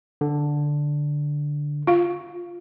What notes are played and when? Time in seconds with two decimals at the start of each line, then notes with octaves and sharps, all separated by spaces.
0.21 D3
1.87 F4 F5